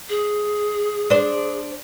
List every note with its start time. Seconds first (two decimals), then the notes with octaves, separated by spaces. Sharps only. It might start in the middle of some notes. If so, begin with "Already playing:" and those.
0.09 G#4
1.10 D4 C5